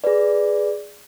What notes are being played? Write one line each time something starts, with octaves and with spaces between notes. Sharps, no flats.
G#4 B4 D5